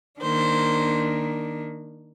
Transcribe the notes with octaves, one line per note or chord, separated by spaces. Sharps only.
D#3 A#3 D4 C5